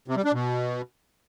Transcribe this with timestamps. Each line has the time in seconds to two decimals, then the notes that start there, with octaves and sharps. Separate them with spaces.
0.08 C3
0.16 G3
0.25 D4
0.33 B2